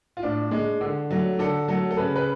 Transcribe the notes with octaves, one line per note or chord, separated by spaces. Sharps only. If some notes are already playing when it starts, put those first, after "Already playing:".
F4
A2 D4
G#3
D3
F#3 A3
D3 A4
F#3 A3 A4
A4
C#3 B4
B4